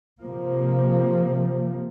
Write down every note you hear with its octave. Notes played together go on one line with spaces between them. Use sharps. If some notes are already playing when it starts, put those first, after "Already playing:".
C3 F3 A#3